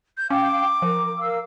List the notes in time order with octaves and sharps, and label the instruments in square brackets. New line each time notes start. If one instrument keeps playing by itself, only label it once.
[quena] G6
[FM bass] C#4 [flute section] F5 G5 [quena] D6
[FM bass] F3 [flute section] A#4
[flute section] A#4 F5 E6